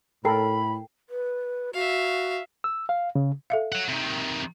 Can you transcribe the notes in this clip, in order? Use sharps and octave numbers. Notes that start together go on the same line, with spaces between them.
A2 A4 A#4 G5 B5 C7
B4
F#4 E5 F5
E6
F5
C#3
A4 E5 F5
C#5 F#5
C3 D#3